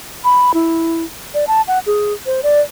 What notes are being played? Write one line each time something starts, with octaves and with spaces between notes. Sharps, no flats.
B5
E4
D5
A5
F#5
G#4
C5
D5